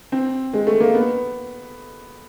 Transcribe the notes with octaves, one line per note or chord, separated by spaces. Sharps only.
C4
G#3
A3
A#3
B3